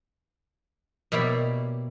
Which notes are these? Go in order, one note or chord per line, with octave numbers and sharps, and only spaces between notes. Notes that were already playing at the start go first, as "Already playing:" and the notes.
B2 A#3 E4 G4 C#5 D5